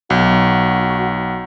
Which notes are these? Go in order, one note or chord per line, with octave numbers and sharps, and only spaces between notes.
B1 F#4